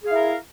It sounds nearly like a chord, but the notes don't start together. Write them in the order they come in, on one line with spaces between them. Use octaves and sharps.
G#4 F5 E4 A#4